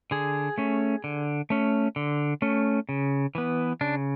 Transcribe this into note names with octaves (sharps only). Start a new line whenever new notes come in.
D3 G#4
A3 C#4
D3
A3 C#4
D3
A3 C#4
C#3
E3 B3
C#3 D4